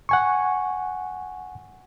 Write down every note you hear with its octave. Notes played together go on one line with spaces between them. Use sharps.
F#5 G#5 C#6